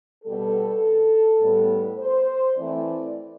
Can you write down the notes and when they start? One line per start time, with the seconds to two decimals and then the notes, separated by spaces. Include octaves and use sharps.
0.24 B2 G3 B3 A4
1.40 A2 G3 B3
1.97 C5
2.55 E3 A3 C4 D5